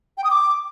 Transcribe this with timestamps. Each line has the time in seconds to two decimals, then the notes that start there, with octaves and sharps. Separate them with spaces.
0.18 G5
0.24 D#6
0.31 D6